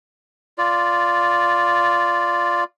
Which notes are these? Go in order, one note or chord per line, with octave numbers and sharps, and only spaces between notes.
F4 D5